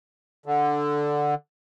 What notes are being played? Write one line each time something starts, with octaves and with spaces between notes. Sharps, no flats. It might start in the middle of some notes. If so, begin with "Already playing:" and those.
D3